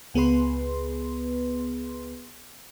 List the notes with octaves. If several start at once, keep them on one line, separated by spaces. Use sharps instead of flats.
C#2 B3 G#4 B4 C6